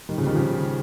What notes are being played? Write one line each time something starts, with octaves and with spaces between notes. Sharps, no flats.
D#3 G3
C#3 F3
D#3 G3
C#3 F3